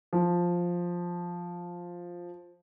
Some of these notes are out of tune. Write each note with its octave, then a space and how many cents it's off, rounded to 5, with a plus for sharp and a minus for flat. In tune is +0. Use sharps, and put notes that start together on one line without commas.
F3 +5